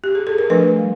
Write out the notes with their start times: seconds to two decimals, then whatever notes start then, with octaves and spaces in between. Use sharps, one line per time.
0.04 G4
0.15 G#4
0.27 A4
0.38 A#4
0.50 F3 A3 D4 A4 B4
0.79 G3